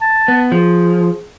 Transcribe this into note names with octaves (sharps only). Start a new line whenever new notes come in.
A5
B3
F3 G#4